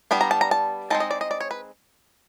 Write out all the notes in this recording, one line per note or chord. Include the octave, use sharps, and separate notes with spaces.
G3 B3 D4 B5
A#5
A5
A#5
A5
G#3 C4 D#4 A5
D#5
D5
D#5
D5
C#5
B4